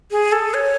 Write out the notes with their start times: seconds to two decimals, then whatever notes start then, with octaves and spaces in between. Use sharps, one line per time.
0.11 G#4
0.32 A4
0.54 C#5